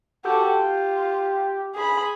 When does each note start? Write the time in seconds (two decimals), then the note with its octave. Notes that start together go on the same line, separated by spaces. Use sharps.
0.25 F#4 G4 A4
0.58 F4
1.75 G#4 B5